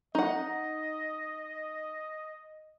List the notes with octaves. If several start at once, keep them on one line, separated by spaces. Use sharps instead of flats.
D#4 D#5 F#5